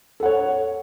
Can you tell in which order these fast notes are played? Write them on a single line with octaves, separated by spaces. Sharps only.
A4 F#5 C#5